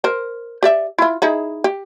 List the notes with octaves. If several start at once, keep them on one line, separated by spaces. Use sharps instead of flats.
A#4 C5
G4 D5 E5
E4 F4
D#4 E4 G#4
G4